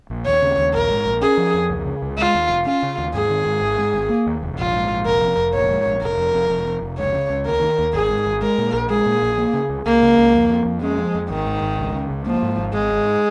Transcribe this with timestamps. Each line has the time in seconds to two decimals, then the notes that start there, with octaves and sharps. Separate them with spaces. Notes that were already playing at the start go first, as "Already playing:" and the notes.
0.10 A#1
0.26 D#2 C#5
0.42 C#3
0.58 D#2
0.74 A#1 A#4
0.90 G#2
1.05 A#1
1.21 C#4 G#4
1.37 F3
1.54 F2
1.70 C#2
1.85 C#3
2.02 C#2
2.18 G#3 F4
2.34 D#2
2.49 F1
2.66 C#4 F4
2.83 C#3
2.98 D#2
3.14 G#2 G#4
3.30 D#3
3.46 G#2
3.62 G#1
3.78 G#2
3.93 G#1
4.09 A#3
4.26 D#2
4.43 F1
4.58 A#1 F4
4.74 G#2
4.90 A#1
5.06 F1 A#4
5.21 F2
5.37 F1
5.54 A#1 C#5
5.71 G#2
5.86 A#1
6.02 F1 A#4
6.18 F2
6.35 F1
6.49 F1
6.66 F2
6.83 F1
6.98 C#2 C#5
7.14 C#3
7.30 C#2
7.45 D#2 A#4
7.61 D#3
7.79 D#2
7.93 G#1 G#4
8.09 G#2
8.26 G#1
8.42 G#3 A#4
8.58 A#2
8.73 A#1
8.90 G#3 G#4
9.06 A#2
9.22 A#1
9.38 A#3
9.53 C#3
9.69 C#2
9.86 C#2 A#3
10.02 C#3
10.18 C#2
10.34 F2
10.51 F3
10.66 F2
10.82 G#3 C#4
10.98 F3
11.15 F2
11.30 G#1 D#3
11.46 G#2
11.62 G#1
11.79 C#2
11.93 C#3
12.10 C#2
12.27 F3 A#3
12.43 G#2
12.58 G#1
12.73 G#1 G#3
12.91 G#2